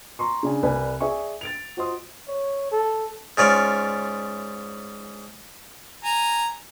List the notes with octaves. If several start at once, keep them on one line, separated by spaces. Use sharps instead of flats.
A#5 C6 C#6
C#3 D4 G#5
C2 B4 D5 G#5
G#4 D5 E5 G#5 C#6
A6 D7 F7
F4 F#4 C5 D#5 C6 D#6
C#5
A4
G#2 C#4 F4 D5
G#5 A#5